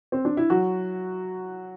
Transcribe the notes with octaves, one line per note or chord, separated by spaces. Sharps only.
C4
D4
E4
F#3 F#4